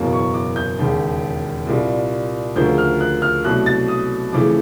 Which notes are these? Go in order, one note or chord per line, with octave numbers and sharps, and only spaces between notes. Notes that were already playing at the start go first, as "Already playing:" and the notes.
Already playing: F#1 E2 B2 F#3 A#3
C#6
D6
G6
E1 D#2 C#3
C2 A#2 G3
D2 C#3 F3 A#3 G6
F6
F#6
F6
C2 B2 F#3 A3 F#6
A6
D#6
F2 C#3 E3 A3 D6